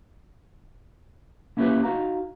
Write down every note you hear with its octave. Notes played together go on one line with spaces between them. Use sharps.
A#3 C#4 E4 F#4 G4 B4
D#4 F#4 F5 A#5